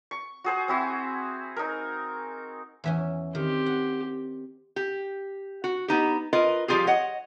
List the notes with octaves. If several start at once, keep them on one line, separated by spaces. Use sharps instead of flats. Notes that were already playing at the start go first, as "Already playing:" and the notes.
C#6
F#4 G#4 C5
C4 E4 F#4
D#4 A#4
E2 E3 C#4
D#3 C4 G4
F#5
G4
F#4
B3 D#4 G4
F4 A#4 B4 D#5
F3 G3 F4 G4 G#4
C#5 D#5 F#5